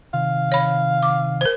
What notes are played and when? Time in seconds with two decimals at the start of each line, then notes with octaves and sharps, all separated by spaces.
0.14 C3 D#3 F5
0.52 C#5 B5
1.03 D6
1.41 A#4 C5